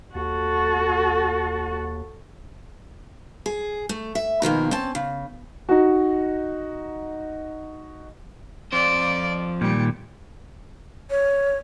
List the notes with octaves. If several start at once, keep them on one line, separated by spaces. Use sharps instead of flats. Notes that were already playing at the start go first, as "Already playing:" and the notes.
D#2 F#4 A4
G#4
A3
E5
B2 D#3 F3 A#3
C4 C#4 A5
C#3
D#4 F#4
F2 C5 D5
A#2 D#3 G3
C#5